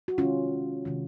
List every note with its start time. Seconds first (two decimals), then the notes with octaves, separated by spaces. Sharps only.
0.08 F#4
0.18 C3 D#3 G#3 C#4 F4
0.85 C3 D#3 G#3